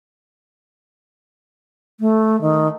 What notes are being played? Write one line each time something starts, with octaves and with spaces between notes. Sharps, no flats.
A3
D#3